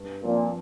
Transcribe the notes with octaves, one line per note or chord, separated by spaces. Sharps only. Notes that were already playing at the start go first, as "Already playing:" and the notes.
Already playing: G2
A#2 F3 C4